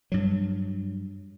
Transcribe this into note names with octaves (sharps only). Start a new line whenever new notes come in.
G2 F#3